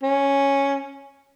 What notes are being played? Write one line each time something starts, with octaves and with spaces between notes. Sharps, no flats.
C#4